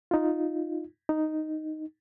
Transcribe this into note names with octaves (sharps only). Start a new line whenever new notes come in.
D#4 F4
D#4